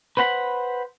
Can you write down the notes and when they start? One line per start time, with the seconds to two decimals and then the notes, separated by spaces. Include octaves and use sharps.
0.17 B4 C5 F#5 A#5 B5